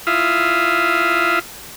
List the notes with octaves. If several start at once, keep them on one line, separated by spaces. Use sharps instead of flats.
E4 F4 E5 F5 D#6